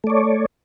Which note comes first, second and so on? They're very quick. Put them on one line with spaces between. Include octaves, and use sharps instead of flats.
A3 D5 C#5